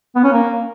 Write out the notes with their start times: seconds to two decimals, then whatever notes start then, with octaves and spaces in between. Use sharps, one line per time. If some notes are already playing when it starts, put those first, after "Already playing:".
0.16 B3
0.24 C#4
0.32 A#3